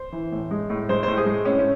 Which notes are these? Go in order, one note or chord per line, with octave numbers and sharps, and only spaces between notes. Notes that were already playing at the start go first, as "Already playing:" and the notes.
Already playing: C5
E3
A2
G#3
A2
G#3 C5
A2 C5
G#4
G#3
A2 C#4
C#4